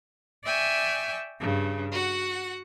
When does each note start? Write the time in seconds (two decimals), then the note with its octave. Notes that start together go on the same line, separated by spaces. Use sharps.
0.43 D5 E5 G5 G#5 C#6
1.38 G2 C#3
1.92 F#4 F#5